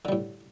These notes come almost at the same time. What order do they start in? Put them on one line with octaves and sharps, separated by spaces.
D3 G3 A2